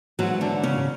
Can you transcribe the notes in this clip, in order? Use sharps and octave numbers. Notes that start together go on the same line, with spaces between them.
G#2 E3 F#3 F#4
D3 D4
C#3 C#4